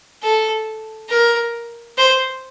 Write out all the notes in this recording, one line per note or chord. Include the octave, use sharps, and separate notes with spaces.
A4
A#4
C5